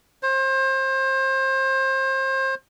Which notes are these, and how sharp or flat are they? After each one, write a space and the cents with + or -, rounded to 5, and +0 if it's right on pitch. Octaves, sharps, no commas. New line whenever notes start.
C5 +30